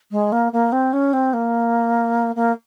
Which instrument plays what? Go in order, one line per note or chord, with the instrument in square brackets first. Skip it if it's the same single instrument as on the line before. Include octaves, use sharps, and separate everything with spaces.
[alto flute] G#3
A#3
A#3
C4
C#4
C4
A#3
A#3